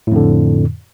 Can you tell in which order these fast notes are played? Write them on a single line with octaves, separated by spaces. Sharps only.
A2 F2 D3